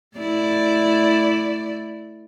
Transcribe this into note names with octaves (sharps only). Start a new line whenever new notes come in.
A3 E4 D5